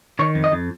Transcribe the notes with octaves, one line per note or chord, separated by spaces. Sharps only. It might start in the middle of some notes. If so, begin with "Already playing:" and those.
D#3 C#5
F2
D#5
F2